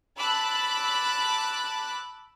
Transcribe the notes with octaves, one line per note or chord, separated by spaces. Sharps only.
A5 B5 D6 E6 F#6